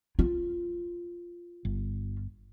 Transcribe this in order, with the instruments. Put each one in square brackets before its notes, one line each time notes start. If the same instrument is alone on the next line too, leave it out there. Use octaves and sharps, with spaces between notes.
[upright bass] F4
[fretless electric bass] G1